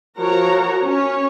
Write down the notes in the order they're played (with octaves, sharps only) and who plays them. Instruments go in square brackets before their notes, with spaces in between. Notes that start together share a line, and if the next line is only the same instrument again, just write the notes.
[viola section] F3 F#4 A#4 C#5 A#5
C#4 C#5